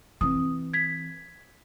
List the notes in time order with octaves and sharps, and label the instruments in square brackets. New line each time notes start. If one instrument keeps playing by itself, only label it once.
[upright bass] E3 C4 [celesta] D#6
[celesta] G#6 B6